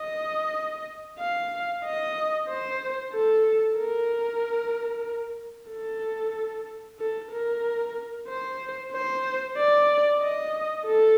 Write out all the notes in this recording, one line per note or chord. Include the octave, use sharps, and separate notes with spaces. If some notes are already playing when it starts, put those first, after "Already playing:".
Already playing: D#5
F5
D#5
C5
A4
A#4
A4
A4
A#4
C5
C5
D5
D#5
A4